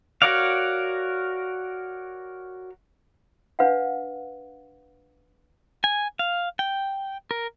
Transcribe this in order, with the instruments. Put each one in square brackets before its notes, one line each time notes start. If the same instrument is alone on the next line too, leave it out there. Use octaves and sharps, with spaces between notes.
[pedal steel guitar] F#4 A#4 C#5 D5 F5
[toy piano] D4 B4 F5 F#5
[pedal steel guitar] G#5
F5
G5
A#4